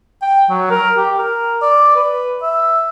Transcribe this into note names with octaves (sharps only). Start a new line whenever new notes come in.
G5
F#3
A#4
G4
A#4
D5
B4
E5